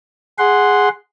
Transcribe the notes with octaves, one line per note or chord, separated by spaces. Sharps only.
G#4 F#5 C6